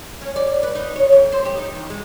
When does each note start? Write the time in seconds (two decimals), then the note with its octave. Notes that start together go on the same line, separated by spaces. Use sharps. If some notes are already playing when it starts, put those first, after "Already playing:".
0.21 C#4
0.36 D5
0.47 D5
0.63 B4
0.75 D#4
0.96 C#5
1.12 F2
1.32 C5
1.45 G4
1.57 D#4
1.75 E2
1.90 G#3